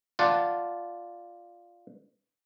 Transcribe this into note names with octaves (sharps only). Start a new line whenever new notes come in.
F4 D5 F#5 A5